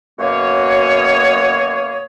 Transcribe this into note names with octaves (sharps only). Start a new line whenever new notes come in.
F#2 B2 A#3 G#4 C#5